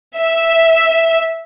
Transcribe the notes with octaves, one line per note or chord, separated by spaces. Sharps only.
E5